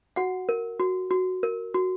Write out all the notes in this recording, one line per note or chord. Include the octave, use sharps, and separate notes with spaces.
F#4 F#5
A#4
F#4
F#4
A#4
F#4